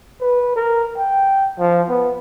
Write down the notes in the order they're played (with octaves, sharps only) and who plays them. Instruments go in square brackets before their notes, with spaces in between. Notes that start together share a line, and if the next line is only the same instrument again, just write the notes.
[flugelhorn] B4
A#4
G5
F3
B3